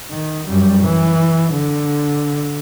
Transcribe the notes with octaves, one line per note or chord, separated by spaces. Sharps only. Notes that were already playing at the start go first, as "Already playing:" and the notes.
D#3
F#2 G3
E3
D3